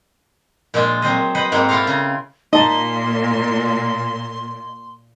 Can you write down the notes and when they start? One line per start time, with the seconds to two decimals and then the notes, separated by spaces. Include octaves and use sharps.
0.74 A#2 F3 G#3 D4 F4
1.02 F#3 C4 C5 D#5
1.35 B4 C5 D#5 F#5
1.52 G#2 A#3 C4 D#4
1.69 E4 F4 G4 A4 F5 A#5
1.87 C#3 A#5
2.53 A#2 D#4 D#5 A5 C6